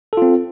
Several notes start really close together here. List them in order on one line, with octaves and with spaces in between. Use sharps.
A4 F4 C4